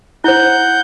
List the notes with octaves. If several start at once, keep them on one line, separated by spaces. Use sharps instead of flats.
E4 C5 F#5 G6